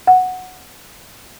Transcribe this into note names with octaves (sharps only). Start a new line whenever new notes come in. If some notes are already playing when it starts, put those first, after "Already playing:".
F#5